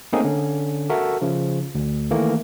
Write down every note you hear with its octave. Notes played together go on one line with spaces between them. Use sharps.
A3 A#3 C4 C#4 D#4 G#4
D3 C#4
F#4 A4 A#4 E5
C#3 F3
D2
D#3 E3 A3 A#3